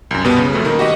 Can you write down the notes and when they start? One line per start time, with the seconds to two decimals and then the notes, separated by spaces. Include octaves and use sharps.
0.11 C2 F#2
0.25 B2 G3 B3
0.38 C#3
0.53 F2 A3
0.65 D#3 A#3
0.79 F#4 G4 D#5 F#5